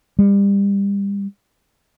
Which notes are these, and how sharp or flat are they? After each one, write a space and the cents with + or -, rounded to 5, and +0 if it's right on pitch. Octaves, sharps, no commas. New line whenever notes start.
G3 +30